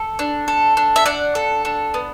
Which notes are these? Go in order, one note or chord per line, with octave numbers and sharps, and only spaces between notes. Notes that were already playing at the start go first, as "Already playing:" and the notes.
Already playing: A4
D4
A4
D4
E5
D4 D5 F#5
A4
D4
B3